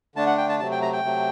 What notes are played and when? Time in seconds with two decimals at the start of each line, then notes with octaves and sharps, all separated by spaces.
0.15 D3 A3 D4 A5
0.27 F#5
0.38 G5
0.49 A5
0.59 C3 F#3 A3 A5
0.72 G5
0.82 A#5
0.93 G5
1.03 C3 F#3 A3